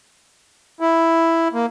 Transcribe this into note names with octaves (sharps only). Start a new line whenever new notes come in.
E4
A#3